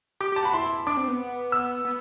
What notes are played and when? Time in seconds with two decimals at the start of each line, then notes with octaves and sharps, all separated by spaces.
0.21 G4 D6
0.32 G4 A5
0.43 F#4 B5
0.53 E4 C6
0.87 D4 D6
0.97 C4
1.08 B3
1.52 E6
1.85 B3